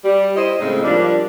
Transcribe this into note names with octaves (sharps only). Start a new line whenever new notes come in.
G3
E4 C5 D#5
A2 C#3 G#3 C4 D#4
F3 G3 A#3 D4